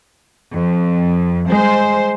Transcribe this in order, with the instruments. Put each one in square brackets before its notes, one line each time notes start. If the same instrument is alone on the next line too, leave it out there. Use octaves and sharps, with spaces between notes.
[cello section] F2
[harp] G#3 [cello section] C5